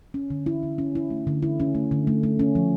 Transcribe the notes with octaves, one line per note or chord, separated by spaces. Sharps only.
C#4
D3
E4
D3
C#4
E4
A3
D3
E4
C#4
A3
D3
A3
A3
C#4
F3